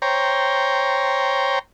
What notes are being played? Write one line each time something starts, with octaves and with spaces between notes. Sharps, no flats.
C5 C#5 G5 A#5